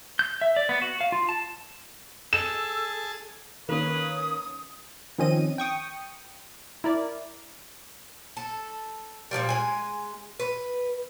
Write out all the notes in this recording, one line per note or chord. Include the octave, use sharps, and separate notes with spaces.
G6
E5
D5
B3
F#4
F5
F4
A5
G#4 A4 A5 E6 E7
D#3 A#3 C#4 B4 D#6
D#3 F3 C4 C#4 D#5 D#7
G5 C#6 D#6
E4 A#4 D5
A4
A#2 D#3 F3 G3
G#3 G#5
B4